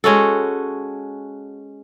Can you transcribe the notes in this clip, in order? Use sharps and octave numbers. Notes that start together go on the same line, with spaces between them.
G#3 C#4 F#4 A4